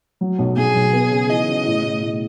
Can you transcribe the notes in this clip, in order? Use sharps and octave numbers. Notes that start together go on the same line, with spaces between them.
F#3
B1
B1 G#4
B1
B3
C#3
E3 D#5
C#3
A2
A2
A2